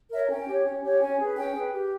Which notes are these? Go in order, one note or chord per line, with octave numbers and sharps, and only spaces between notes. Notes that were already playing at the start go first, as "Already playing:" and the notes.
A#4 C#5 E5
C#4 G5
G4 C#5
C#4
G4 C#5
C#4 G#5
G#4 B4
C#4 G5
G#4 B4
G4